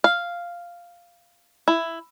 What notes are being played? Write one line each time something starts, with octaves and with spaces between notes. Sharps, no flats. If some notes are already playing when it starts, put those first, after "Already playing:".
F5
E4